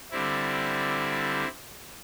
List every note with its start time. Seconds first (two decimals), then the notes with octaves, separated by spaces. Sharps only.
0.11 D3 G3 C4 E4